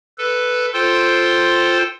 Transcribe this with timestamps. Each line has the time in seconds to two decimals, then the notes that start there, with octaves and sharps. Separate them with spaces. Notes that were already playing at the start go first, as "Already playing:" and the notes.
0.18 A4 B4
0.74 F4 A4 C5 G5 C6